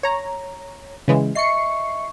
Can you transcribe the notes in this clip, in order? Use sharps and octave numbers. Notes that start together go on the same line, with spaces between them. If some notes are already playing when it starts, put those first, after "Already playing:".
C#5 A#5
C#3 E3 G#3
D#5 E5 C#6 C7 C#7